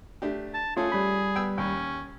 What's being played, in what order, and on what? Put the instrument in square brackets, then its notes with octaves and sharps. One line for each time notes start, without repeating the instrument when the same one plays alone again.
[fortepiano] A3 D4 G4
[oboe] A5
[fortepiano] A3 C#4 A4 [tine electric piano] F4 [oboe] G#4
[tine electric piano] G3 B5
[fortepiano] B3 G5 E6
[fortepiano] D#2 [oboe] C#4